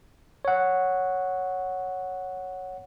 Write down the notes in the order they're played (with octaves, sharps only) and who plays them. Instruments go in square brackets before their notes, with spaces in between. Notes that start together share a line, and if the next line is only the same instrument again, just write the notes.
[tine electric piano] C#5 F#5